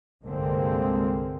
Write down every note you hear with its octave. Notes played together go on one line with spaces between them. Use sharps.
C2 G2 D3 G#3 A#3 C4